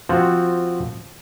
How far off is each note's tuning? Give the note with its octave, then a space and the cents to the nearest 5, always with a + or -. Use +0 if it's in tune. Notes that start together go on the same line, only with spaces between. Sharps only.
F3 +0 C4 +0 F#4 +0